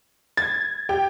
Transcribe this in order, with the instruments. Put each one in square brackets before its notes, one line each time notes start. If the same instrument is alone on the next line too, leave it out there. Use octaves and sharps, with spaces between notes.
[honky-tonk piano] G#6 [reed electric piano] A6
[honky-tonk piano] G4 G5